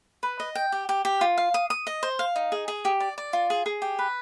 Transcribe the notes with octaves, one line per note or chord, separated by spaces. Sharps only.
B4
D#5
G5
G4
G4
G4
F4
F5
D#6
D#6
D#5
C5
F5
D#4
G#4
G#4
G4
D5
D5
F4
G#4
G#4
G4
B4